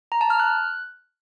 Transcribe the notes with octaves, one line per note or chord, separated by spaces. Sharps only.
A#5
A5
F6
F#6